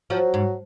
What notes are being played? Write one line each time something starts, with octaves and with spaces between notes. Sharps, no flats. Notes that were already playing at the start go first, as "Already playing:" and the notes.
F3 F#3
G#2